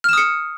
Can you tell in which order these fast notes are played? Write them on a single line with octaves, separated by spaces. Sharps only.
F6 E7 D#6 C#7